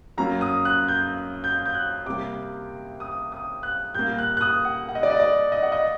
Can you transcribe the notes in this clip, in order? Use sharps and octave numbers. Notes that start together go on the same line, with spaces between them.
F#2 F#3 A#3 A#5
D#6
F#6
G6
G6
G6
F#6
C3 G3 A#3 D6
D#6
D#6
F#6
A#2 G3 A#3 G6
F#6
F#6
D#6
F#5
F#5
D#5
D5
D#5
D5
D#5
F#5
D#5